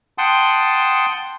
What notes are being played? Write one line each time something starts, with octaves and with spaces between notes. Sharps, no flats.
F#5 G5 A5 C6 D#6